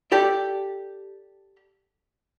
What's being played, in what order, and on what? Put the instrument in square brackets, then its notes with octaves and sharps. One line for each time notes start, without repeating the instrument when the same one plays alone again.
[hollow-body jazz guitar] G4 A4 D5